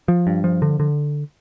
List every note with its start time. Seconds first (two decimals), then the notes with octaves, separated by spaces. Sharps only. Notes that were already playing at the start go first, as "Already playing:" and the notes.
0.08 F3
0.27 G2
0.44 F3
0.62 D3
0.80 D3